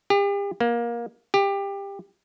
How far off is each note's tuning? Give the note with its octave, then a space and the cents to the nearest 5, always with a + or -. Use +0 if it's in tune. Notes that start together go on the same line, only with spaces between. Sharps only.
G4 +40
A#3 +20
G4 +20